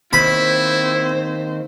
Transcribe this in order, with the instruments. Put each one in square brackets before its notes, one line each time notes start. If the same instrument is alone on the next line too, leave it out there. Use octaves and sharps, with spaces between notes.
[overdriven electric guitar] D#2 [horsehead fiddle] C4 C5 [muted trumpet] E4 [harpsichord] B5